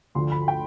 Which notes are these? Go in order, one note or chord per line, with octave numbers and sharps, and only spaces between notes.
D2 D3 F3 C6
B5
G5